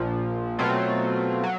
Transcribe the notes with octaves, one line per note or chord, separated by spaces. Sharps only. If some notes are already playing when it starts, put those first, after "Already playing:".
Already playing: A#1 A#2 F3
B2 F#3 A3 C4 F4
F#3